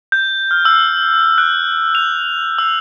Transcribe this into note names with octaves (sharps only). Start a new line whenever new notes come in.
G6
F6
E6
F#6
F7
E6